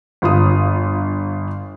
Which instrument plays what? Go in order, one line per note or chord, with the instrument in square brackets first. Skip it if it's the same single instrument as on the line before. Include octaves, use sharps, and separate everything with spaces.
[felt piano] G1 F4 D#6